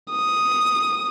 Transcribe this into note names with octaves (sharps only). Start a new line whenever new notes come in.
D#6